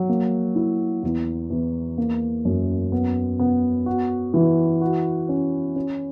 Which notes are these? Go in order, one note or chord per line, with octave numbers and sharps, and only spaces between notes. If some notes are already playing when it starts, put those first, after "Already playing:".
Already playing: F#3
A#3
E4
E2
E2
A#3
F#2
B3
B3
F#4
E3
F#4
C#4
C#4